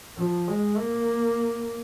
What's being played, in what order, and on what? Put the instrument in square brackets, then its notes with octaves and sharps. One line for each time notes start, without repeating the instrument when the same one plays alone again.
[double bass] F3
G#3
A#3